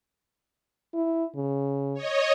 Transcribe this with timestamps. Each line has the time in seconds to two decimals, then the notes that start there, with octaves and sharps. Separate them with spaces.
0.94 E4
1.36 C#3
1.94 C#5 D#5